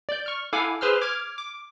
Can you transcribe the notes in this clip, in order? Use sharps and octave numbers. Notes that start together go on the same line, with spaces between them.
D5 G6
C#6 F6
E4 A4 F5 F#5 G#5 D6
G#4 B4 C5 C6 E6 F6
D6 F6 G#6
D6